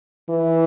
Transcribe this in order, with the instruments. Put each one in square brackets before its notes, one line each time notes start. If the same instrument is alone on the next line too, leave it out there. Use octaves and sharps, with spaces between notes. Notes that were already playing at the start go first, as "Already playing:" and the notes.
[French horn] E3